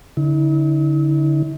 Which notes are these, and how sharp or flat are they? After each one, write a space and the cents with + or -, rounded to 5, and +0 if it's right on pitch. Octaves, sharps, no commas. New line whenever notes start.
D3 -30 E4 -45